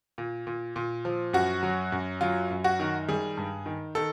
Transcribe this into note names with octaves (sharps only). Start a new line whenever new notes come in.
A#2
A#2
A#2
F3
F#2 F#4
F#3
F#2
F#3 F4
F#2
F#4
D#3
G3 G#4
G2
D#3
D#3 A4